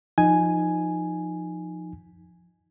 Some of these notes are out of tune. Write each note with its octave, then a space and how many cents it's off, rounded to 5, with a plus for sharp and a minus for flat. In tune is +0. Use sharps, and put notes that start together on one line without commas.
F3 +0 D#4 +0 G#5 +0